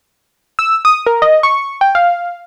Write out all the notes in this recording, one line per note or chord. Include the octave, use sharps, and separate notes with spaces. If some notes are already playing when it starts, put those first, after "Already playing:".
E6
D#6
A#4
D#5
C#6
G5
F5